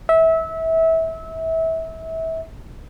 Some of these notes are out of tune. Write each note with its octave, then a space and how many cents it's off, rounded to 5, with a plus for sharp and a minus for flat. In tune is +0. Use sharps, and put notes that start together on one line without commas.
E5 -25